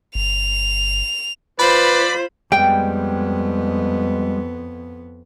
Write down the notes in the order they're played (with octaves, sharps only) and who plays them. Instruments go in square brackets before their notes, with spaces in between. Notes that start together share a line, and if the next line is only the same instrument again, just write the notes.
[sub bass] G1 [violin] F7
[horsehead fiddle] F4 C5 [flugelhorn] B4 [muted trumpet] D5 [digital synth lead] B5
[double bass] F2 B3 [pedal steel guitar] G3 G#3 [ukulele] G5